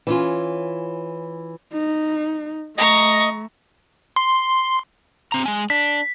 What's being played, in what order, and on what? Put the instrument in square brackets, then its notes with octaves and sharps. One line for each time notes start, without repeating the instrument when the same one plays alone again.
[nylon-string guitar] E3 C#4 F4
[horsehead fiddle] D#4
[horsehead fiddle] A3 [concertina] D#5 [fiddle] A#5 C#6
[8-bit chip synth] C6
[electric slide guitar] C4 A#5
G#3 G#5
[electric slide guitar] D4 [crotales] B6